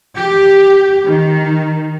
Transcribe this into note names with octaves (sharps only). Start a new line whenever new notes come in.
G4
D#3